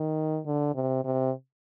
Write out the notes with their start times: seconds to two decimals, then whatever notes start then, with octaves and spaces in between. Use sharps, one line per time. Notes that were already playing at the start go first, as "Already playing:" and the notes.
Already playing: D#3
0.46 D3
0.75 C3
1.04 C3